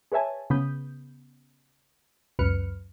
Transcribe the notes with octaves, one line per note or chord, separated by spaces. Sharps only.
G#4 B4 C#5 E5 G#5 A5
C#3 B3 B5 D#6 G6
C#2 F#2 B4 F6 C#7